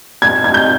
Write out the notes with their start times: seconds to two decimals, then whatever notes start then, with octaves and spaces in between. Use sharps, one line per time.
0.22 G#6
0.44 G#6
0.54 G6